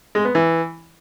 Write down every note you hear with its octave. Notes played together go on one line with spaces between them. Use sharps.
G#3
B3
E3